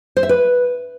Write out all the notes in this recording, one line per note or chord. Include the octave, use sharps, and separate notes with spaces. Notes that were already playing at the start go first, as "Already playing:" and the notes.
C5
E5
B4